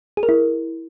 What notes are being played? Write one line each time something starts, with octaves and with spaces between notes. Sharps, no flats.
G#4
A#4
E4